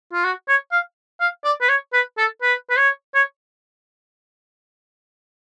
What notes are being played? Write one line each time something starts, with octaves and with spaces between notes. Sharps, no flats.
F4
F#4
C#5
F5
F5
D5
B4
C#5
B4
A4
B4
B4
C#5
C#5